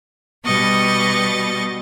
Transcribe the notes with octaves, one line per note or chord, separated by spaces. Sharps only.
B2 G3 B3 D#5 C#6 A6